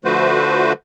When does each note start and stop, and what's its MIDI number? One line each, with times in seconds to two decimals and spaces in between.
0.05 0.72 50
0.05 0.72 53
0.05 0.72 57
0.05 0.72 66
0.05 0.72 71
0.05 0.72 72